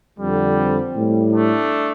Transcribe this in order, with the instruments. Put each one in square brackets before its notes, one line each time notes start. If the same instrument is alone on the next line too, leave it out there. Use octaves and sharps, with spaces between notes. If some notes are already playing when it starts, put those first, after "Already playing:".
[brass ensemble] F2 D3 G3
C4
A2 G3
A3 D4